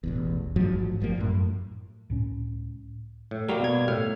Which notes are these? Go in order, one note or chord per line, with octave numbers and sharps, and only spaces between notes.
E1 A1 E2
A1 G#2 F3 F#3
G#1 F3 G3 A#3
F#2 A2
C#2 A2 C#4
A2
G3 A#3 F#4 A#4
B2 G#6
A2 F6